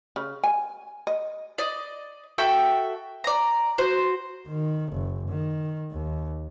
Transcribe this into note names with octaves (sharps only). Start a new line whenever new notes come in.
C#3
G#5
D#5
D5 D#5
F#4 A4 E5 G5
D5 A#5
F#4 C5
D#3
F#1
D#3
D#2